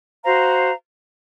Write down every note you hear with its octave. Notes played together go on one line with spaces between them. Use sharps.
F#4 C5 F5 A#5